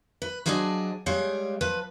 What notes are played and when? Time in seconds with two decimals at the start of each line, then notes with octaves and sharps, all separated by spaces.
0.22 B4
0.46 F3 F#3 D4 G#4 D5 D#5
1.06 G3 G#3 C#5 F5 G5
1.61 F3 B4